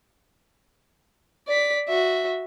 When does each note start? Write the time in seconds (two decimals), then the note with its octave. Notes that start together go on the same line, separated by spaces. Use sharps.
1.48 D5 B6
1.88 F#4 E5